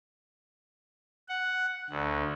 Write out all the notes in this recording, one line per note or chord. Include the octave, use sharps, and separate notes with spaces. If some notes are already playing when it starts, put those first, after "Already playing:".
F#5
D2